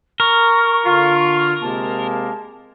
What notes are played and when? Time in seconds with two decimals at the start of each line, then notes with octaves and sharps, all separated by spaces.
0.20 A#4 C#6
0.85 D3 F4
1.62 C3 G#3 A#3 A5